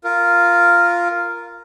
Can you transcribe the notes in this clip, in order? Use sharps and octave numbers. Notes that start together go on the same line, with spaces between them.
F4 A#4